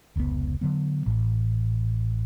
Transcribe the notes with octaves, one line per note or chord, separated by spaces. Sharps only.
F1 C#2 B2 B3
D3 F#3 B3
A1 A2